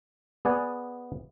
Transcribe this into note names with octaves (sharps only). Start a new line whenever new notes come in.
B3 G#4 D5 F#5 G#5